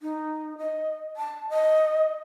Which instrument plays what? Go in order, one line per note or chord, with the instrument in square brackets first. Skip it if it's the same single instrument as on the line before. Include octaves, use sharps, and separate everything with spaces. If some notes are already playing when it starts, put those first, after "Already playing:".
[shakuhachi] D#4
D#5
A5
D#5